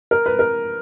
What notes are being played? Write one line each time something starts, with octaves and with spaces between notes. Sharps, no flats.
A#4
B4
A#4